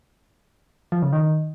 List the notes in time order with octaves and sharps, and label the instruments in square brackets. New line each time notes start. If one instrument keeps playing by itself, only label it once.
[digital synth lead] F3
C#3
D#3